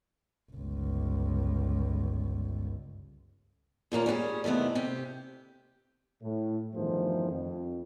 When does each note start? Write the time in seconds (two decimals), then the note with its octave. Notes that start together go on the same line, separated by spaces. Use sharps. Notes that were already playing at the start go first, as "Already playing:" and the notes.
0.52 G1 C#2
3.92 D#2 A#2 A#3 C#4
4.06 G3 C#4 F#4 G#4
4.44 E2 C3 D#3 A3 B3
4.75 C3 G4
6.22 A2
6.74 E2 G2 D#3 F3 A3 C5
7.30 F2